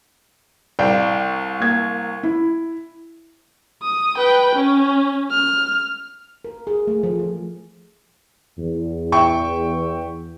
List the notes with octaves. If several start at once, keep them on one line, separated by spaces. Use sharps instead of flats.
C2 D5 F5 G5
A#3 G#6
E4
D#6
B4 G5
C#4
F6
A#4
G#4
A3
F3
F3
E2
E5 G5 C#6